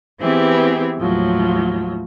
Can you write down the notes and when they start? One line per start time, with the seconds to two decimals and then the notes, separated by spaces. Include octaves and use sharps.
0.21 E3 B3 C4 E4 G4 G#4
0.98 D#2 A2 F3 F#3